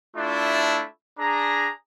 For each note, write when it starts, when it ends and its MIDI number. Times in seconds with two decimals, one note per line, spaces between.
0.16 0.83 57
0.16 0.83 62
0.16 0.83 64
0.16 0.83 65
1.18 1.70 62
1.18 1.70 68
1.18 1.70 82